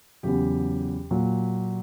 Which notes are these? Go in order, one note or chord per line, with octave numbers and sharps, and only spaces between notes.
E2 C#3 F#3 G4
A#2 F#3